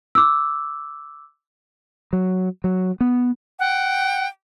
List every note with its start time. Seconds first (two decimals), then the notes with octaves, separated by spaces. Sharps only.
0.15 D6 E6
2.13 F#3
2.64 F#3
3.01 B3
3.59 F#5 G5